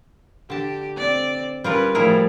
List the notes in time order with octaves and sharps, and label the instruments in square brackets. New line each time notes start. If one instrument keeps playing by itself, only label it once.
[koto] D3 A5 [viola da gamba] G4
[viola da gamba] C4 D5
[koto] G3 F4 A#4 [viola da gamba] C#4 B4
[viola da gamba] A2 F3 G3 [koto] E4 G#4 A#4